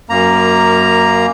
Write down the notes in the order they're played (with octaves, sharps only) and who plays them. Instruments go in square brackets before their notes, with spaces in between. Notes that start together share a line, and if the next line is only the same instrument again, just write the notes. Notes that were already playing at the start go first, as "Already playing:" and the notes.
[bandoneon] F#2 A#3 A#5